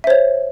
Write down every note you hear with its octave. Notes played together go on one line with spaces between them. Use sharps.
C5 C#5 E5